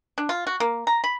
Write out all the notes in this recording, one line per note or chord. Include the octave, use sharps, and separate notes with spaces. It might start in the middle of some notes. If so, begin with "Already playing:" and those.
D4
F4
F#4
A#3
A#5
B5